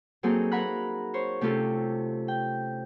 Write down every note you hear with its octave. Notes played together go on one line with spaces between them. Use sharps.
F#3 A#3 C4 D#4 G#4 A4
A#4 F5 F#5 A#5 B5 F#6
C5 C#5
C3 A3 C#4 F4 G4 A4
G5